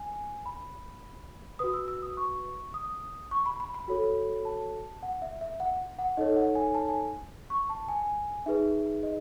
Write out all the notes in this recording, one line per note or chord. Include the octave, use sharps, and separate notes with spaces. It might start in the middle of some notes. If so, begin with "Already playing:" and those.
Already playing: G#5
B5
F#4 B4 D#6
E6
E6
D#6
C#6
D#6
C#6
B5
B5
B5
F#4 A4 C#5
A5
F#5
E5
E5
F#5
F#5
D#4 A4 C#5 D#5
F#5
G#5
A5
G#5
C#6
A5
G#5
D#4 G#4 B4 E5
D#5